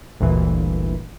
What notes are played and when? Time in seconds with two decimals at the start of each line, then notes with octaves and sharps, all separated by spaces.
0.20 G1 D2 A#2 E3